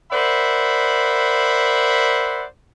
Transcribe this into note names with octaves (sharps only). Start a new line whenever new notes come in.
A#4 C5 D5 E5 F#5 B5